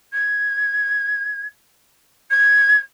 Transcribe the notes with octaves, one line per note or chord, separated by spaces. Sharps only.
G#6
G#6